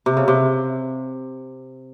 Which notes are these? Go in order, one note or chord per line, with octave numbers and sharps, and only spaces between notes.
C3
C#3
C3